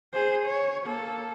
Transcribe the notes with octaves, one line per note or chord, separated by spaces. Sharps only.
G#4 C5
C#5
A#3 A4